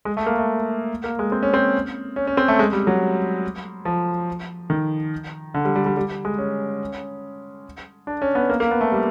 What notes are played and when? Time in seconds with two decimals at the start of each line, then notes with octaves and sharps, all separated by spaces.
0.05 G#3
0.17 A3
0.26 A#3
0.38 A3
1.04 A#3
1.19 G#3
1.32 C4
1.43 C#4
1.54 C4
2.16 C#4
2.27 C#4
2.37 C4
2.48 A3
2.59 G#3
2.73 G3
2.87 F#3
3.85 F3
4.70 D#3
5.54 D3
5.65 G3
5.76 G3
5.86 G3
5.97 G3
6.25 G#3
6.38 C#4
8.07 D4
8.22 C#4
8.35 B3
8.50 A#3
8.60 A#3
8.71 B3
8.81 A3
8.92 G3